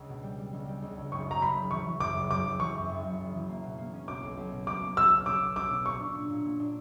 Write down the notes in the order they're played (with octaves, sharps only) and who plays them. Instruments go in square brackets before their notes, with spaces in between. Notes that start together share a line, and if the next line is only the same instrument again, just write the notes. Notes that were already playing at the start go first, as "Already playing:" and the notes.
Already playing: [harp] C#2
B2
G3
G3
C#2
G3
C#2
C#2
[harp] F#1 [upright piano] C#6
[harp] F#2 [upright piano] A#5
[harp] F#1 [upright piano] B5
[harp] F#1
[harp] E3 [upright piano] C#6
[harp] E3
[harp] F#2 [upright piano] D6
[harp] F#1
[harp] F#1 [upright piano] D6
[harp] F#2
[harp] E3 [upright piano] C#6
[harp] F#2
F#1
F#1
F#1
E3
A#3
B2
A#3
C#4
[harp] B2 [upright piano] D6
[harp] B1
B1
B2
[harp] B1 [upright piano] D6
[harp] A#3
[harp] C#4 [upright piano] E6
[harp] B1
[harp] C#4 [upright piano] D6
[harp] B2
[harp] C#4 [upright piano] D6
[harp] B2
[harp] A#2 [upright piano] C#6
[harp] D4
A#2
A#2
A#2
D4